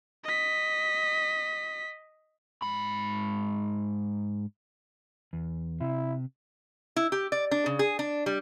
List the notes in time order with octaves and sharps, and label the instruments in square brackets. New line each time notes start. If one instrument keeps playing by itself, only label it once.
[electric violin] D#5 B6
[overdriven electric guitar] G#2 B5
[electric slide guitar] E2
[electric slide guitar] C3 [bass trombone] E4
[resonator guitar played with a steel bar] E4
G4
D5
D4
C#3
G#4
D4
G3